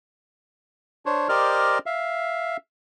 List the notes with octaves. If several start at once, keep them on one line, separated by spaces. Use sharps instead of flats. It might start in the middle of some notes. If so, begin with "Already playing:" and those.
D4 C5 C#5
G4 A#4 C5 D5 D#5 F6
E5 F5